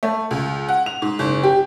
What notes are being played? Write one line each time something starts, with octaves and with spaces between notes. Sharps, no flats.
A3
C#2
F#5
F7
G#2
F#1
G4